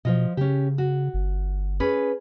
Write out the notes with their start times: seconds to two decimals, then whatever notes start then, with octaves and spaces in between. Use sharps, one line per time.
0.05 B2 F3 F4 D#5
0.37 C#3 C#4 G4
0.78 F#4
1.14 G1
1.80 C#4 G#4 B4